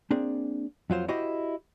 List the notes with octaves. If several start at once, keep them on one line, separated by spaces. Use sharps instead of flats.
A#3 C4 D4 G#4
F2 F#3 F4 C5
E4 F#4 G4 C5 D#5